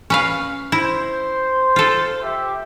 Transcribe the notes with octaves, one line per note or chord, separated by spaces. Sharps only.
C#4 B4 F5
E4 C5
F4 A4
G4 E5